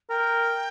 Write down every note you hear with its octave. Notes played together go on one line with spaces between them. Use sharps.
A#4 G5